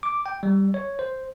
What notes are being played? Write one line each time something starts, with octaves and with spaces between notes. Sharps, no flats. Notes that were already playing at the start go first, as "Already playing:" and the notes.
D6
G5
G3
C#5
C5